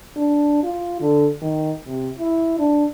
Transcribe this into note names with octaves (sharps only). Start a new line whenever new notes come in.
D4
F4
D3
D#3
C3
E4
D4